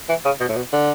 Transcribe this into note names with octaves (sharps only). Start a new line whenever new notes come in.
E3
C#3
B2
A2
B2
D3